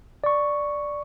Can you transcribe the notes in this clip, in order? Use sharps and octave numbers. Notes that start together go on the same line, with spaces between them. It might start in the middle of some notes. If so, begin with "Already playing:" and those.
D5 C#6